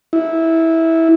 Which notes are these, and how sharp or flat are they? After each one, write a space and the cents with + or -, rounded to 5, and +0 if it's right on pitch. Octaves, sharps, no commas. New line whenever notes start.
E4 -15